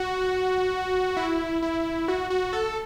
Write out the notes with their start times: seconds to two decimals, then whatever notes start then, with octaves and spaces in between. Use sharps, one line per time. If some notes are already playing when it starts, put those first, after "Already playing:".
Already playing: F#4
1.17 E4
1.62 E4
2.08 F#4
2.30 F#4
2.53 A4